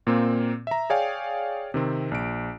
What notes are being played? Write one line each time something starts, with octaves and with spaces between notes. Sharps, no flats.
A#2 A#3 C4
E5 A#5
G#4 C#5 D5 F5 G5 G#5
C3 D#3 C4
A#1 D7